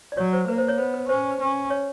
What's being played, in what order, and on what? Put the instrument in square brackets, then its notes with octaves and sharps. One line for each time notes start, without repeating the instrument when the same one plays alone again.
[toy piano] D5
[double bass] F#3 [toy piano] C#5
[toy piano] C5
[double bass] A#3 [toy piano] B4
[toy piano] C5
C#5
[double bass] B3 [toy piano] C5
[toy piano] B4
[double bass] C#4 [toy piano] C5
[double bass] C#4
[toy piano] C#5